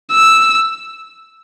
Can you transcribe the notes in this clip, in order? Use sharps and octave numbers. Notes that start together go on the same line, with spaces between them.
E6